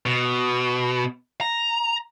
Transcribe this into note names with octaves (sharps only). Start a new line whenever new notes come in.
B2
A#5